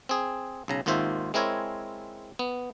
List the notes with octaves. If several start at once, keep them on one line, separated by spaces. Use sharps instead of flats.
C4 G#4
B1 C#3 A#5
G#1 D#2 D#3 F4 C5 E5
G#3 C4 E4 A#4 C#5 G#5
B3